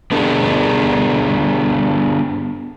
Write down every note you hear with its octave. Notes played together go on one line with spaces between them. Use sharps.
D3 B3 D4 G4 G#4 A#4